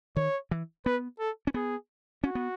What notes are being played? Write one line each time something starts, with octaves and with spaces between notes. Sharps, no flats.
D#3 C#5
E3
B3 B4
A4
C#4
B3 G#4
C#4 F#4
B3